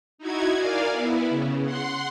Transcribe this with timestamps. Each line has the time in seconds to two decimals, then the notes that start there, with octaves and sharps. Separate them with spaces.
0.18 D#4 E4 F#4 G#6
0.54 A#4 D5 F5 G#5
0.91 B3 E4
1.29 C#3
1.64 F#5 C6